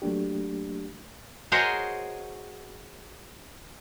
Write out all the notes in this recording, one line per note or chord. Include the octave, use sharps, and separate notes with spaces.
F#3 A3 A#3 D4 G4
F#4 G#4 A#4 C5 C#5 D#5